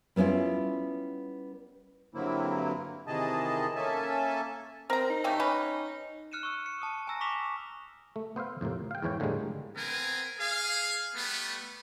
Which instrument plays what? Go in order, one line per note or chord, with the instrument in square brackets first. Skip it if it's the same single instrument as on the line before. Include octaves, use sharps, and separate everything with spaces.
[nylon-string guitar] G3 B3 C#4 E4 F4
[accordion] G2 D3 F#3 A#3 C4 E4
C3 D#3 E3 G#4 D#5 A5
A#3 C#4 A4 E5 G#5 A5
[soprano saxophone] C4 [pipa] A#4 A#5
[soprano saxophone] D#4
[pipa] C#3 A3 G4
C#4 B4
[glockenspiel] F6 F#6 C#7 D#7 E7
C#6 E6
C#7
A5 D#6
G#5 A#5 E6 A#6
C#6 D6 B6 E7 F7
[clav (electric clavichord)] A3
B3 C5 E5 F5
F2 A2 C3 A#3
F5 G5
E2 G#2 E3 C#5 G5
A2 D3 F3 G3 G#3 A#3
[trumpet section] B3 C4 A#4 G#5
G#4 F5
G3 A3 B3